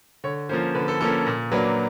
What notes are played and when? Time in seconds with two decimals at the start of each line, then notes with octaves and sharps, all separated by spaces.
0.24 D3 C#5
0.49 F3 A#3 C#4 C5
0.75 D3 B4
0.88 A4
1.00 F3 A#3 C#4 A4
1.26 A#2
1.52 F#3 A#3 D4 B4